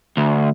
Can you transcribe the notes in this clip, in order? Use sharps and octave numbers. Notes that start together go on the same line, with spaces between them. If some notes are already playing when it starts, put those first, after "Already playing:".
D2